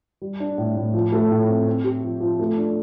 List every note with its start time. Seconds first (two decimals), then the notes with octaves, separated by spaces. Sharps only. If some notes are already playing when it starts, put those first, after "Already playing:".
0.22 G3
0.40 D4
0.58 A2
0.76 A2
0.94 F3
1.12 A3
1.31 A2
1.48 C4
1.66 C4
1.84 G4
2.03 F3
2.20 F3
2.39 A3
2.57 D4